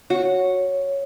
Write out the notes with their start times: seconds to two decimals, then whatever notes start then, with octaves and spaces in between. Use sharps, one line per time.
0.10 F#4 C#5